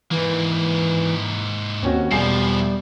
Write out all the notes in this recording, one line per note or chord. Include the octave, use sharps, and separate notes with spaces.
G#2 E3 A#3
D#2 C4 C#4 F#4
E1 F3 G3 E4 G#5 C7